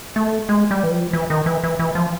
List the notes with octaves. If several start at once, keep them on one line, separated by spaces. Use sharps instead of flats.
A3
G#3
G3
E3
F3
E3
D#3
E3
E3
E3
F3